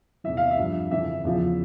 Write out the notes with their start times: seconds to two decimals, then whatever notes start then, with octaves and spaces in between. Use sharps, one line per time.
0.24 E2 C3 E3 E5
0.37 F5
0.51 E5
0.58 G2 F3
0.91 F2 C#3 E3 E5
1.24 E2 C#3 F3